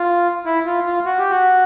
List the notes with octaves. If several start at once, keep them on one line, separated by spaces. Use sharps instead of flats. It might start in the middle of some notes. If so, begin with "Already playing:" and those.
Already playing: F4
E4
F4
F4
F#4
G4
F#4